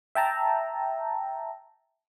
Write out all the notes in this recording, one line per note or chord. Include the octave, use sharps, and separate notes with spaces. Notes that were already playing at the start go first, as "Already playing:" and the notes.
E5 G5 A5 A#5